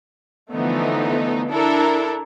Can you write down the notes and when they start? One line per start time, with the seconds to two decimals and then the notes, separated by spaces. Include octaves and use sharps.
0.52 D3 E3 F3 A3 B3 D#4
1.51 D4 E4 A4 A#4